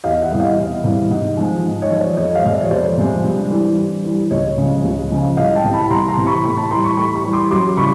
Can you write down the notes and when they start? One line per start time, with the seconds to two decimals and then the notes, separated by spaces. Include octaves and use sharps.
0.04 E2 D#5 F5
0.22 E5 F#5
0.31 C3 E3 G3
0.40 D#5 F5
0.58 E2
0.84 C3 E3 G3
1.11 G#2
1.37 F3 G#3
1.64 G#2
1.82 C#5 D#5
1.91 F3 G#3
2.00 C5 D5
2.17 F2 C#5 D#5
2.35 D#5 F5
2.44 C3 F3 G#3
2.53 D5 E5
2.62 C#5
2.71 F2 C5 D5
2.98 C3 F3 G#3
3.24 G2
3.51 E3 G3
3.77 G2
4.04 E3 G3
4.31 C#2 C#5 D#5
4.58 C#3 F3 G#3
4.84 C#2
5.11 C#3 F3 G#3
5.37 C2 D#5 F5
5.55 G5 A5
5.64 C3 E3
5.73 A5 B5
5.90 C2 A#5 C6
6.08 A#5 C6
6.18 C3 E3
6.26 B5 C#6
6.44 A2 B5 C#6
6.57 A5 B5
6.70 E3 G3 A#5 C6
6.84 B5 C#6
6.97 A2 B5 C#6
7.15 B5 C#6
7.24 E3 G3
7.33 C6 D6
7.51 F#2 C6 D6
7.77 C#3 E3 G3 B5 C#6